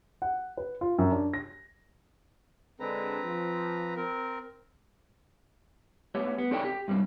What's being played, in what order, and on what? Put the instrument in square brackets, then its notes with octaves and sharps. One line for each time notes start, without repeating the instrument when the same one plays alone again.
[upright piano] F#5
B4
F4
F#2
D4
A#6
[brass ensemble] D3 G#3 [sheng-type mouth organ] C4 B4 A#5
[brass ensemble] F3
[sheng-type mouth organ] C4 A#4
[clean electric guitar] A3 B3 G4 C#5
B3
C4 G4 A4 C#5 D5 G5
G4
G2 G3 C4